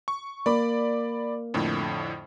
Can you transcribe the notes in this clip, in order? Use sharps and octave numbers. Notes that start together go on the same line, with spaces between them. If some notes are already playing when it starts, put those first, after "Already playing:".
C#6
A#3 D5 B5 D6
F2 A2 D3